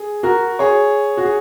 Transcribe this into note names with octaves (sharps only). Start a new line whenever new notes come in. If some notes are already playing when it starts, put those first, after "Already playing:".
Already playing: G#4
F#4 A#4
G#4 C#5
F#4
G#4